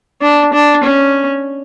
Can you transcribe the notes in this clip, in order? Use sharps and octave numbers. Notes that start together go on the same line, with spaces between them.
D4
D4
C#4